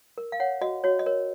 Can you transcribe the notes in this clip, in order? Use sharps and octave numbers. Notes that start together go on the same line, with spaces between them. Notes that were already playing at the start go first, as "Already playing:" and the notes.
A#4
F5
C#5 F#5
F#4 D#5
F#4 C#5
D#5
A#4 C#5